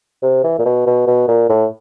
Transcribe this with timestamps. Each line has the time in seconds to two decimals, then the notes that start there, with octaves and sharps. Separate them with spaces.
0.23 C3
0.44 E3
0.59 A#2
0.65 B2
0.86 B2
1.07 B2
1.28 A#2
1.50 A2